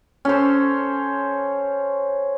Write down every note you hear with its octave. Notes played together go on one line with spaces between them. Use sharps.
C#4 A4 C5